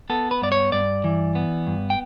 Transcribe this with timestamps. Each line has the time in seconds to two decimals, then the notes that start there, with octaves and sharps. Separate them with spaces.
0.10 B3 A4
0.31 B4
0.42 G2 D5
0.52 C#5
0.72 G2 D5
1.04 E3
1.35 B3
1.67 G2
1.90 G5